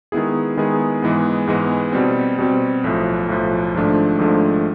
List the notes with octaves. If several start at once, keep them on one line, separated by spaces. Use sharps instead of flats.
D#3 G#3 B3 E4 G#4
D#3 G#3 B3 E4 G#4
G#2 E3 G#3 B3
G#2 E3 G#3 B3
B2 G3 C4
B2 G3 C4
B1 A2 F3
B1 A2 F3
G#1 G#2 F3 A3 D4
G#1 G#2 F3 A3 D4